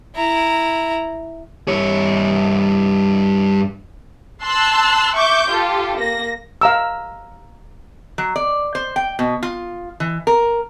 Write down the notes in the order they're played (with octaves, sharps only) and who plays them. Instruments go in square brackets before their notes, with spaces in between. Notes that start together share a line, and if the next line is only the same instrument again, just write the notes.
[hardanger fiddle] E4 A#5
[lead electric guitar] G2 C#5
[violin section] A5 C6 E6 F#6
E5 C#6 D6 G6
F4 G4 A4
A#3 A#6
[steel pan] F5 A#5 E6
[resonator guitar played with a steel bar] F#3
D5
C5
G5
B2
F4
E3
A#4